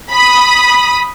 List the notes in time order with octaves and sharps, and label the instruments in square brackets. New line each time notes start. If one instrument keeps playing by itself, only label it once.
[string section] B5 D#6